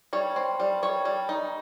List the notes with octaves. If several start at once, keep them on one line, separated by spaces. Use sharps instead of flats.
G3 C#5
C4
G3
G3 C#5
G3
D#4